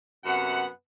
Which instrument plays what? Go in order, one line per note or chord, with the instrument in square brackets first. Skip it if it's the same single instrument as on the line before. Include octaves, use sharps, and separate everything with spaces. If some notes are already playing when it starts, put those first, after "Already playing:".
[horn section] F#2 C3 B3 F#5